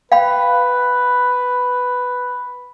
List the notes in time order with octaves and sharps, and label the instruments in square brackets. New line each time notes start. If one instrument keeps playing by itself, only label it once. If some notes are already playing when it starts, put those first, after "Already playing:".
[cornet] B4 [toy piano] F5 G5 B5